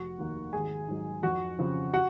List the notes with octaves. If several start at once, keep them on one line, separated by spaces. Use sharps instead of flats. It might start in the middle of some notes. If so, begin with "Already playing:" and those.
Already playing: F1 F#4 F#5
D#2 D#3 A#3
G#1 G#4 G#5
G#2 F#3
F2 F#4 F#5
C#3 F3 C4
F#4 F#5